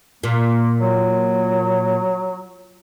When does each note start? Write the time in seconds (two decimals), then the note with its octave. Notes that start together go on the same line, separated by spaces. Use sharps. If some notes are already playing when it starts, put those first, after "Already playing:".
0.23 A#2 A#3
0.80 F#3